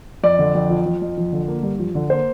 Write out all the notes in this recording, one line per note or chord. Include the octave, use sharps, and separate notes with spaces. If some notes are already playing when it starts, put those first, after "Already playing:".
F2 D5
D3
F2
F3
F3
F2
F3
D3
A#3
G2
F3
D3
A#3 C5